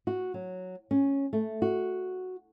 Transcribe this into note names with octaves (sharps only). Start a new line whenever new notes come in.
F#4
F#3
C#4
A3
F#4